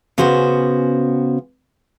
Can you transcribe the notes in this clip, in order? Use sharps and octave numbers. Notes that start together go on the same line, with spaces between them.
C#3 B3 C#4 F#4 C5